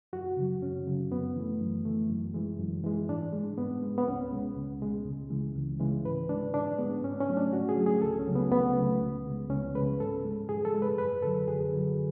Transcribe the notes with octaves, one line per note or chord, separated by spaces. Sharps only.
F#2 F#4
C#3 F#3
F#2 C#4
C#3 F#3
F#2 B3
E3 A3
F#2
E3 A3
F#2
E3 G#3
F#2
E3 G#3
G#2 D4
G#3
G#2 B3
G#3
B3
C#2 C#4
B2 G#3
C#2
B2 G#3
C#2
C#3 E3 G#3
C#2
C#3 E3 G#3
G#2 B4
G#3 D4
G#2 D4
G#3 B3
G#2 C#4
C#4
F#3 A3
D4
G#2 F#4
G#4
F#3 A3
G#4
C#2 A4
C#4
C#3 F#3 A3
B3
C#2 B3
C#3 F#3 A3
C#2
C#3 G#3
C#2 C#4
C#3 G#3 B4
G#2 A4
G#3
G#2 G#4
A4
G#3
B4
F#2 B4
D3 F#3 A4
F#2 G#4
D3 F#3